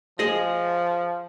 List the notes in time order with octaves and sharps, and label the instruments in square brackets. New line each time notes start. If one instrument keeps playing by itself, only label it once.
[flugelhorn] F3 [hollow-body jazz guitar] G#4 D#5